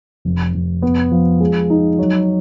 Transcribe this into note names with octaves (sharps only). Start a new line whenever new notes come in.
F1
F1
B3
F3
G#3
D#4
F#3